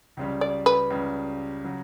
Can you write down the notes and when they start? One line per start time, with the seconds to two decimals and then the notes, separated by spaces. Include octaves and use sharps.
0.17 C#2 C#3 G3
0.41 D5
0.66 B4
0.90 C#2 C#3 G3
1.64 C#3 F#3